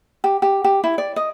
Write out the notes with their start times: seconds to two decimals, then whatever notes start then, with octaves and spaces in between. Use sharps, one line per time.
0.24 G4
0.42 G4
0.64 G4
0.84 E4
0.98 D5
1.16 D#5